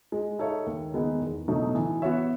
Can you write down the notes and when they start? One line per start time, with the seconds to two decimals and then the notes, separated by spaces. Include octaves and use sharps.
0.12 G#3
0.39 D#4 A4 C#5 E5
0.66 D#2
0.94 D#3 G#3 B3 D#4
1.21 E2
1.48 B2 F#3 A3 D#4
1.75 E3
2.02 B3 F#4 C#5 E5